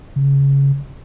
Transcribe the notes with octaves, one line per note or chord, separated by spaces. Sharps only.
C#3